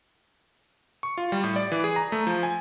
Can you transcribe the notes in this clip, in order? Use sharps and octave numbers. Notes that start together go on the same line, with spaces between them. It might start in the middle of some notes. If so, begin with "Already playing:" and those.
C#6
F4
G3
A2
D5
E3
G#4
A#5
A3
F3
G#5